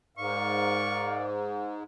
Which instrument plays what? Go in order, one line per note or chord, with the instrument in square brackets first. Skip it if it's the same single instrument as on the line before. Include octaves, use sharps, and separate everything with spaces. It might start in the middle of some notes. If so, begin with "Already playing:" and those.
[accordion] G#2 [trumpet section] A#4 D5 F5 [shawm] C#6